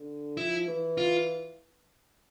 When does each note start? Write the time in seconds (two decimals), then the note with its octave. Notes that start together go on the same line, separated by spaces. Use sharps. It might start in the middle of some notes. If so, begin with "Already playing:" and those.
Already playing: D3
0.37 F3 E4
0.68 E3
0.97 F4